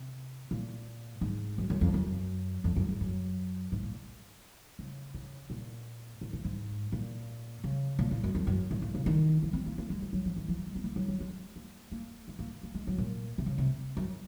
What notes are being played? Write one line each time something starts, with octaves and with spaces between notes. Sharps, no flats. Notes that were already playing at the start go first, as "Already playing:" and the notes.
Already playing: C3
A#2
G#2
F#2
F#2
F2
F#2
F2
F#2
G#2
F#2
G#2
A#2
C#3
C#3
A#2
A#2
A#2
G#2
A#2
C#3
A#2
A#2
F#2
F2
F#2
A#2
A#2
C#3
D#3
F3
C4
A#3
A#3
G#3
G#3
F#3
F3
D#3
F3
F#3
G#3
C4
A#3
F#3
F#3
G#3
A#3
A#3
G#3
A#3
A#3
G#3
F#3
A#2
C3
C#3
C3
F#2